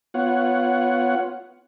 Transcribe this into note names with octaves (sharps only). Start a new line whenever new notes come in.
B3 F4 C#5 F#5